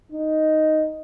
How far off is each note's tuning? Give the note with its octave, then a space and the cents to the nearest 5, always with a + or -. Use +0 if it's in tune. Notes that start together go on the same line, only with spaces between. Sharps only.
D#4 +0